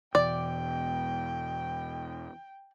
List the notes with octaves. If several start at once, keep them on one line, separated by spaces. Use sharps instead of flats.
E2 B2 D5 G5